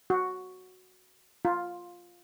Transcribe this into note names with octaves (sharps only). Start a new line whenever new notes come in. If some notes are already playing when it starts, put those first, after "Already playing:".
F#4
F4